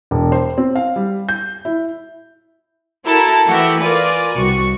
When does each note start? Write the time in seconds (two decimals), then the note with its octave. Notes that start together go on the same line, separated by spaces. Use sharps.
0.11 E1
0.32 C5
0.58 C4
0.75 F5
0.96 G3
1.29 G6
1.65 E4
3.04 E4 F#4 A4 A#4 A5 A#5
3.46 E3 A3 E4 F#4 G4 E5
3.80 F4 A#4 B4 D5 G#5
4.35 C2 F#4 C#6